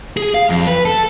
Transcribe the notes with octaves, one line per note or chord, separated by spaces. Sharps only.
G#4
F5
F2
B4
A4